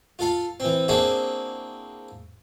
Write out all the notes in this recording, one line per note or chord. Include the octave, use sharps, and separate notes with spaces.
F4 A4 F5
E3 C4
A#3 C4 D4 E4 F#4 G#4